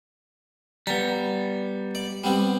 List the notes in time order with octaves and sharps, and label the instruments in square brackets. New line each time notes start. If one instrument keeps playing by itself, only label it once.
[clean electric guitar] G3 B3 [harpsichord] A#5
[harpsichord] D5
G3 B3 C4